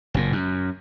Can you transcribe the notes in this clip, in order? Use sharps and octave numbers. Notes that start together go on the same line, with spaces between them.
F#1 A#2
F#2